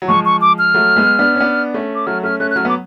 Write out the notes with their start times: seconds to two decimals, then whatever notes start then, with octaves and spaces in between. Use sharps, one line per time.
0.02 F#3
0.08 F3 G#3 C#6
0.25 C#6
0.41 D6
0.59 F6
0.74 F#3 A3
0.96 G#3 B3
1.19 B3 D4
1.35 C#4
1.40 B3 D4
1.74 A3 C#4
1.95 D6
2.07 F#3 A3 F6
2.23 A3 C#4 F6
2.40 A3 C#4 F#6
2.51 F#6
2.56 F#3 A3 F6
2.65 B3
2.69 D6